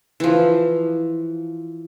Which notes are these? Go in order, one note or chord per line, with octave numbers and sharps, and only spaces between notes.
E3 F3